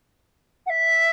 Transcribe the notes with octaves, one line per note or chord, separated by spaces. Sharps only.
F#5
E5